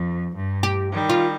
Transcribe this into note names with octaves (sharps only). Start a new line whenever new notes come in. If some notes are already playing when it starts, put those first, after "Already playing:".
Already playing: F2
G2
G4
D#3 G3
F4